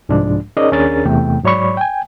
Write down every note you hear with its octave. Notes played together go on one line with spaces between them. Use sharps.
C2 G#2 F3 G#3 D4
C#4 D#4 G#4 A#4 D5 D#5
D#2 C#4 D4 G#4 A#4 A6
E2 C3 A3 G5
G#2 F#3 C#5 D5 B5 C#6
G5 G#5